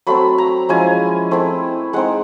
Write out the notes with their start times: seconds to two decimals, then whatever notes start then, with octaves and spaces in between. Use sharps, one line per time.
0.07 F#3 A3 C4 B5
0.38 A#5
0.69 F3 G#3 C#4 E4 G#5
1.31 A3 C4 E4
1.93 G#3 C4 D#4 F#5